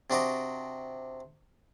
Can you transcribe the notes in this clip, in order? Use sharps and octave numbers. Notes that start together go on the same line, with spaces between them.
C3 D4 F#4 D#5 D6